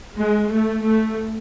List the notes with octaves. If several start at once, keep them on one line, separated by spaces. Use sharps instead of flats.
G#3
A3
A3